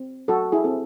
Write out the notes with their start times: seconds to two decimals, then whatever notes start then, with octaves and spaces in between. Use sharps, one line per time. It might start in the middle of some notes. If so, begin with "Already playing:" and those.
Already playing: C4
0.28 F#3 F#4 A4
0.52 E4 G#4
0.64 C4 A4